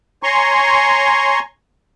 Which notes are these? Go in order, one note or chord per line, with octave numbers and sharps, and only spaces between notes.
C#5 G#5 A#5 C6 C#6